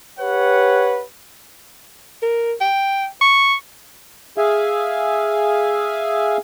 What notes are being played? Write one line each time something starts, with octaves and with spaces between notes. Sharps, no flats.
G4 B4 C#5 F#5
A#4
G5
C#6
G#4 E5 F5 G#5